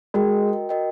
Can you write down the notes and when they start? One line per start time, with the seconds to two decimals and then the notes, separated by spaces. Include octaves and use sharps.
0.14 G#3 F#4 A#4 D#5 G5
0.69 F#4 A#4 D#5 G5